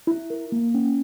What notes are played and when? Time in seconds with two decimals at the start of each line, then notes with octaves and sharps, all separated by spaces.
0.07 E4
0.30 A#4
0.52 A#3
0.74 C#4